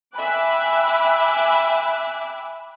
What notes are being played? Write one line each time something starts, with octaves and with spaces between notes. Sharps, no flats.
E5 G5 G#5 B5 D6 F#6